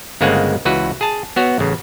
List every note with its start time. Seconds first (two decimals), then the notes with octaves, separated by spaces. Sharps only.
0.21 G1 C#3 G#3 A#3 C4 F#5
0.65 C#2 E3 F#4 B4
1.01 G#4 A5
1.36 B3 F#4 C#5
1.59 A1 C#3